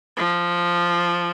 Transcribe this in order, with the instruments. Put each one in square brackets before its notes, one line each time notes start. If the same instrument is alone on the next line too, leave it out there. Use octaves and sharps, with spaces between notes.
[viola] F3